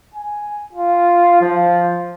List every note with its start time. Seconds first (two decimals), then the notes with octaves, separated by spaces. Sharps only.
0.14 G#5
0.73 F4
1.41 F3